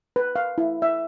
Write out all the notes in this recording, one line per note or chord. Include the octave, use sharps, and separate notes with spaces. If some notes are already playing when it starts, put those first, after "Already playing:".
B4
F5
E4
E5